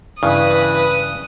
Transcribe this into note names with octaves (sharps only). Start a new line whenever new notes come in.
G2 C#3 E3 B4 D#6